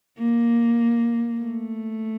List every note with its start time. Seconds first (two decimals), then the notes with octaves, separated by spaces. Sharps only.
0.18 A#3
1.40 A3